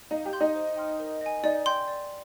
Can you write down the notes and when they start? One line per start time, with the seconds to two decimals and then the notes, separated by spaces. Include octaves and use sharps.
0.11 D#4 F5
0.25 G4
0.33 C6 G6
0.41 D#4
0.55 C5
0.77 G5 C6 F6
0.99 A#4
1.21 D#5 G#5
1.43 D#4 D5
1.66 G5 C6 G6
1.88 D5